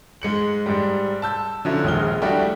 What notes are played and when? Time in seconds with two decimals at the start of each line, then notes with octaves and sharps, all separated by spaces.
0.22 G#2 G#3 C#7 F#7
0.66 G#2 G3
1.22 A5 E6 G6
1.65 D3 F3 F#3 C#4 E4
1.84 A#1 D#2 G#3 D#6 F6 G7
2.22 G3 A3 D4 E4 F#4 G4